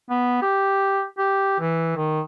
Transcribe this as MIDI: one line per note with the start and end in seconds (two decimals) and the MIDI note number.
0.10 0.40 59
0.42 1.03 67
1.18 1.59 67
1.60 1.94 52
1.96 2.21 51